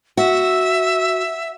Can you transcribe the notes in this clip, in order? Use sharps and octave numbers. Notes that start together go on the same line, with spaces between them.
F#4 E5